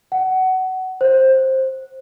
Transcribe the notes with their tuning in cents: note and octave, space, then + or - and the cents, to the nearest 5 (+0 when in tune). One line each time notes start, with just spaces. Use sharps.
F#5 +20
C5 +15